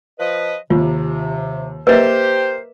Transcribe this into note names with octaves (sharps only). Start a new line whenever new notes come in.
F3 B4 D#5
D#2 C3 F4
A#3 G4 B4 C5 D#5 E5